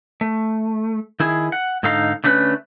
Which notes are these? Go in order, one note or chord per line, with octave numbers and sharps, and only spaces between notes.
A3
D#3 E4 G#4
F#5
G#2 D3 D#4 A4 F5 A#5
D3 A3 C#4 A4 B4